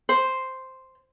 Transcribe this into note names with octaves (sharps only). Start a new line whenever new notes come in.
C5